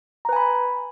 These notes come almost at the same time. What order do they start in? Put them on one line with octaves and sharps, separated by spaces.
A#5 B4 G#5 B5